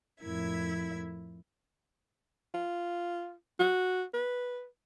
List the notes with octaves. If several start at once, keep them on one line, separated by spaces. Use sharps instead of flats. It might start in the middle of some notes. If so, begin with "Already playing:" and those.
F2 A2 E4 A#4 E5 G#6
F4
F#4
B4